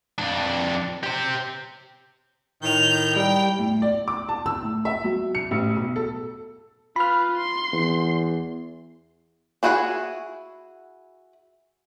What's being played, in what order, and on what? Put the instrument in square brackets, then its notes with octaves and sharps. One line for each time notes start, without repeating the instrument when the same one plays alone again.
[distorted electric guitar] F2 D4
G4 C5
[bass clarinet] A2 [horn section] D#3 [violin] G6 F7
[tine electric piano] G3 [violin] G5
[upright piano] A2
D5
D6
A5
E6
A2
E5
F#3
C#7
A1
B1
A4
[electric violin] F4 B4 [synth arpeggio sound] B5 F6
[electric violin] C6
[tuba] E2
[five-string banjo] D4 E4 F#4 G#4 F#5